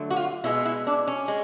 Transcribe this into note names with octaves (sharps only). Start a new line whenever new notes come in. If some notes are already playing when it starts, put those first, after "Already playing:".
Already playing: D3 F#3 A3
F#4
F4
B2 G#3 E4
E4
D4
C#4
G#3